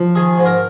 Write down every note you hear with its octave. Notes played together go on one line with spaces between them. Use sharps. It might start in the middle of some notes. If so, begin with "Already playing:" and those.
Already playing: F3
D#3 G#4
G#2
A#4